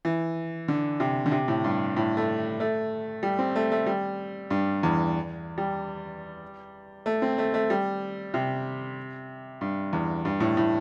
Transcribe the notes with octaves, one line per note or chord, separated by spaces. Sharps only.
E3
D3
C3
D3
C3
A2
G2
A2
A3
A3
G3
C4
A3
A3
G3
G2
E2
G3
A3
C4
A3
A3
G3
C3
G2
E2
G2
A2
A2